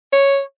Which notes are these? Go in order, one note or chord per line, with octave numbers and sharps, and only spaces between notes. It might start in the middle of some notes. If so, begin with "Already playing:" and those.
C#5